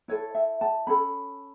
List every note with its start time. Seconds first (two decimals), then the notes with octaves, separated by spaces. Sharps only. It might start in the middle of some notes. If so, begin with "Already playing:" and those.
0.08 E4 A4 C#5
0.35 E5
0.61 A5
0.87 C#4 A4 B5